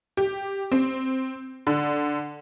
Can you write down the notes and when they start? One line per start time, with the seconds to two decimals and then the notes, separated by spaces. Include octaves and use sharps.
0.17 G4
0.72 C4
1.67 D3